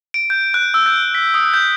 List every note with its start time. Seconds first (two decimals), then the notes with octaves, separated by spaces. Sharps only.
0.14 D7
0.30 G6
0.54 F#6
0.74 E6
0.86 G6
1.15 B6
1.34 D#6
1.54 G6